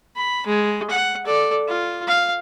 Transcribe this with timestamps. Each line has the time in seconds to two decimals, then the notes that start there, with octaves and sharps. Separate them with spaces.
0.16 B5
0.46 G#3
0.90 F#5
1.25 A4 D5
1.68 F4
2.07 F5